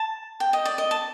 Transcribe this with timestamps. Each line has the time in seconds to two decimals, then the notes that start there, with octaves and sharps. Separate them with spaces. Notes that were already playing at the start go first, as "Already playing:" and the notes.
Already playing: A5
0.40 G5
0.53 D#5
0.65 D5
0.78 D#5
0.91 A5